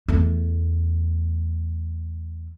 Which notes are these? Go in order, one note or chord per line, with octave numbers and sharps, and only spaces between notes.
E2 A3